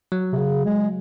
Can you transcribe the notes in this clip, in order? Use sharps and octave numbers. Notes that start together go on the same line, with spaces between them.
F#3
C3
C#3
G#3